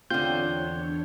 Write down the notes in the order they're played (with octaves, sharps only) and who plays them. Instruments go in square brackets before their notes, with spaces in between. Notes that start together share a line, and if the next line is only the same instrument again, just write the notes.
[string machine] E2 D4 C#5 [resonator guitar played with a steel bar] D3 C4 [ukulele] F4 [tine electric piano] G6